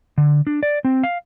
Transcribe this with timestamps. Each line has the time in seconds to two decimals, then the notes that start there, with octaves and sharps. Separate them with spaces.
0.18 D3
0.47 D4
0.63 D5
0.85 C4
1.03 F5